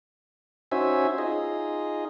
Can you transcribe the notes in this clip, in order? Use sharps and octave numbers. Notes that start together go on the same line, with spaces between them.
C#4 D#4 F#4 C5 E5 G#5
D#4 F4 G#4 D#5